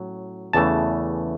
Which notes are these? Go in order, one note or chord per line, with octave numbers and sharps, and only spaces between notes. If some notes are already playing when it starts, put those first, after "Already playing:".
Already playing: A2 F#3 C#4
E2 C#3 E3 A3 A5